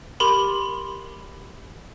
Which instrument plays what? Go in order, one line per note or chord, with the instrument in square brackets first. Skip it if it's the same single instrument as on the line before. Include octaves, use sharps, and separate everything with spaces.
[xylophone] G4 A#4 B5 C6